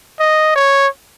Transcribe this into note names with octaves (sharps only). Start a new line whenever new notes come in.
D#5
C#5